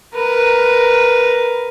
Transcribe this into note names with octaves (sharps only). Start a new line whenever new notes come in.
A#4 B4